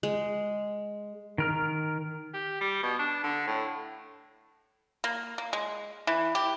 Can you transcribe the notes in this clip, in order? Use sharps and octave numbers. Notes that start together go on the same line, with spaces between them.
G#3
D#3 A#4 F6
G4
G3
B2
D4
D3
A2
A#3
A#3
G#3
E3
G4